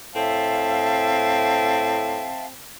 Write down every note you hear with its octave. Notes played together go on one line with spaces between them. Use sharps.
A2 C4 E5 F5 A5